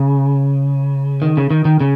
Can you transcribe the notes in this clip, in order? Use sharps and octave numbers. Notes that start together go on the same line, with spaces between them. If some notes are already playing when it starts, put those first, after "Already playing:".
Already playing: C#3
D#3
C#3
D#3
D#3
C#3